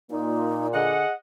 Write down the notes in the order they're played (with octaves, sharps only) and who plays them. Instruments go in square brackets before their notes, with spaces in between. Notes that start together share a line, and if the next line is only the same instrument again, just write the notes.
[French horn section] A#2 [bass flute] D#4
[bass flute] D3 [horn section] G#4 D#5 F#5